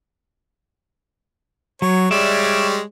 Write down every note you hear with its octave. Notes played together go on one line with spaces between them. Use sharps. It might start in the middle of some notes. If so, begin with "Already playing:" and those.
F#3 C#5
G3 G#3 C#5 D5 E5